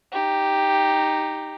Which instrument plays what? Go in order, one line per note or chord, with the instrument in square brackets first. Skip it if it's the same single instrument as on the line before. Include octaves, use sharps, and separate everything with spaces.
[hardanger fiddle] D#4 G4